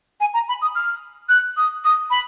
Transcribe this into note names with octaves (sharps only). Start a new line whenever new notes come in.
G#5
A#5
B5
D#6
F6
F#6
D#6
D#6
B5